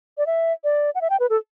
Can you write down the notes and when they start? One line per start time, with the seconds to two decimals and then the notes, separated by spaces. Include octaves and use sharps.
0.18 D5
0.26 E5
0.64 D5
0.95 F#5
1.01 E5
1.10 G5
1.20 B4
1.30 A4